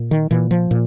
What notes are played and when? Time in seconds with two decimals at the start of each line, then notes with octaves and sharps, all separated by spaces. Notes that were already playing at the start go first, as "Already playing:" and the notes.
Already playing: A#2
0.11 D#3
0.31 A#2 E3
0.51 F3
0.71 A#2